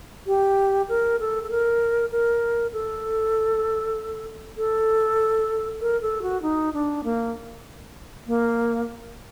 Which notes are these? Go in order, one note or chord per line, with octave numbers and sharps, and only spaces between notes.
G4
A#4
A4
A4
A#4
A#4
A4
A4
A#4
A4
F#4
D#4
D4
A#3
A#3